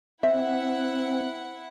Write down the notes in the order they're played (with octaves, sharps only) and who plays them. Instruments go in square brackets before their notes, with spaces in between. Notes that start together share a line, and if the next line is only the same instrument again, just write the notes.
[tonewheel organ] C4 [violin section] E4 F#5 [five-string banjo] E5